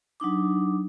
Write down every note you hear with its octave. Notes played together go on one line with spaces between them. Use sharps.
F#3 D4 D#4 D6